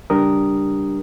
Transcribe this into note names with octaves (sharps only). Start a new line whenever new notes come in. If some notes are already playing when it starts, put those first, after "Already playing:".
C#2 G3 D4 G4 A#4 D#6